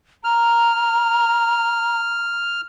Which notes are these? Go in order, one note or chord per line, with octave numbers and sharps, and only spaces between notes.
A#5 F6